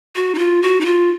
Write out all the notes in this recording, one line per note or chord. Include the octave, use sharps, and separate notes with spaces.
F#4
D#4
F4
F#4
D#4
F4